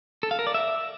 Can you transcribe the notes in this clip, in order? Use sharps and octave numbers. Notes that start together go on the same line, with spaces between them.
A4
F5
A#4
D5
E5